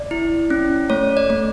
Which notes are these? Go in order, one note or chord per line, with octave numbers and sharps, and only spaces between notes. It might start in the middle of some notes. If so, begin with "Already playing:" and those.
Already playing: D5
E4
C#4
A3 C#5
D5
A3